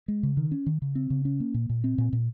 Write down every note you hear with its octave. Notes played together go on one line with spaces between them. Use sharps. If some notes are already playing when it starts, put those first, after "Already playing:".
G#3
C#3
D#3
C#4
D#3
C#3
C4
C#3
C#4
A#3
A#2
A#2
C4
A#2
A#2